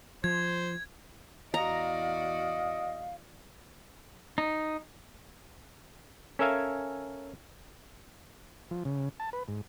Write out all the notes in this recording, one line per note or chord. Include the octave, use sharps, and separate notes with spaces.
F3 C5 G#6
E2 F#4 D5 D#5 F5 A#5
D#4
C#4 A4 A#4 E5 F5 G#5
F3
C#3
A5
B4
G#2